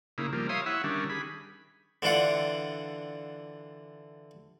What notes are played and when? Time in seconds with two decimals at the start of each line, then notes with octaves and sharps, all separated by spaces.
0.18 C#3 A#3 D#4 E4
0.33 F3 G3 A#3
0.49 C#5 E5 F5 C6 D#6
0.66 E4 C#5 E5 F#5
0.84 D#3 G3 C#4 D4
1.10 G#4 B5
2.02 D3 E3 D4 F4 F#5